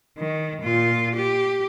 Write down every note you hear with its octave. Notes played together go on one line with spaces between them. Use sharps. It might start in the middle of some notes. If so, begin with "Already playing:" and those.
D#3
A#2 F4
G4